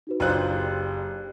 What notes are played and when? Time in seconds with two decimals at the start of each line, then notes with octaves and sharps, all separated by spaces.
0.07 D#4 F#4 B4
0.20 F#1 D4 F4 G4 C5 F#6